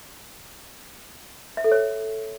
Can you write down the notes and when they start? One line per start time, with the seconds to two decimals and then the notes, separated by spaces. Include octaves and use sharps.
1.57 E5
1.64 A4
1.72 C#5